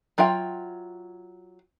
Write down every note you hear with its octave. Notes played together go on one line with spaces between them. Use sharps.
F#3 F4 E5 G5